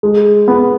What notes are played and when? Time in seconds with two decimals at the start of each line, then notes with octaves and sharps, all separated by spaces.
0.03 G#3
0.48 B3